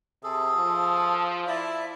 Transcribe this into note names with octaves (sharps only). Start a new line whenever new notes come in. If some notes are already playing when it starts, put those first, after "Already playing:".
C3 G#4 A4
F3
E4 D5 E5